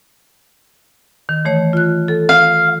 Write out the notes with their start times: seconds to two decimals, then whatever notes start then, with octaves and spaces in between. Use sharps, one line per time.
1.29 D#3
1.45 E3 A3 C#5
1.73 F4 F#6
2.08 A4
2.29 F5